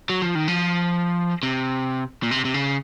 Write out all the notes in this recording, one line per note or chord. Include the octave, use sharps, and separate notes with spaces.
F#3
F3
D#3
F3
C3
A#2
C3
C3
C#3